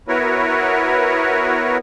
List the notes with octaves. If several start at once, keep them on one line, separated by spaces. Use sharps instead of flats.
B3 E4 F#4 A#4 B4 C#5